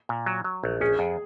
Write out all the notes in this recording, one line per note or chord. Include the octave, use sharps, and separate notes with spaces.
A#2
F#3
F#3
A#1
C#4 G#4
F2